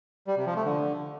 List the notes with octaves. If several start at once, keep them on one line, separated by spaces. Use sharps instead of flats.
G3
C3
F3
A3
D3